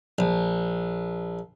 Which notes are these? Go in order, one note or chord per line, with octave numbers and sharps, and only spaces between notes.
A#1